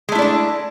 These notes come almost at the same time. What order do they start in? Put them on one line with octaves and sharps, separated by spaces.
G#3 A3 E4 D5 D4